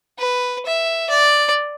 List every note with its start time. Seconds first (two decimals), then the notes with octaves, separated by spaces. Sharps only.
0.19 B4
0.66 E5
1.10 D5